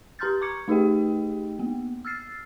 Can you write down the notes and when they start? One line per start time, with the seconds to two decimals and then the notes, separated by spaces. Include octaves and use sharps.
0.19 G4 A#5 C6 F6 G6 A6
0.41 A#5 C#6 D6 G#6 C#7
0.68 A3 D#4 G4 G#4 D#5 G5
1.59 A#3 B3
2.05 E6 F6 A6 C7